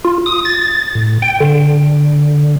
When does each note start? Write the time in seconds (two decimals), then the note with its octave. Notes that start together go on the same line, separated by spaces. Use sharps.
0.05 F4
0.26 D#6
0.45 A6
0.95 A2
1.22 G5
1.40 D3